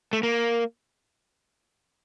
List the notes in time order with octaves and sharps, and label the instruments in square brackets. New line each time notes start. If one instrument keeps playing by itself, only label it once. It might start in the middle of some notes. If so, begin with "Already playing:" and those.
[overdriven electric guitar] A3
A#3